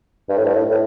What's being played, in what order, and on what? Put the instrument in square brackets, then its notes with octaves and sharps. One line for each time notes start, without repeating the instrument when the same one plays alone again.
[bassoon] G2
A2
G2
A2
A2